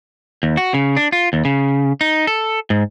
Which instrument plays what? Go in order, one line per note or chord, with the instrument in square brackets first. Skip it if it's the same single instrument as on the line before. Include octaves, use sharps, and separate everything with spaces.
[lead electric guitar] D#2
F#4
C#3
D4
F4
D#2
C#3
D#4
A4
G#2